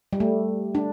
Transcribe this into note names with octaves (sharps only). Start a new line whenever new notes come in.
G3
A3
D4